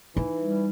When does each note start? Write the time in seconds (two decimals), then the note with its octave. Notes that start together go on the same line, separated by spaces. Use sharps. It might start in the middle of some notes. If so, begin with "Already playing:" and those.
0.16 E3 D#4
0.39 G3